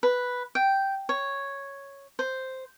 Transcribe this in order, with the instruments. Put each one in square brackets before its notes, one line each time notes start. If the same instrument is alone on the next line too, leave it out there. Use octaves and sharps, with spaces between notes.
[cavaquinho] B4
G5
C#5
C5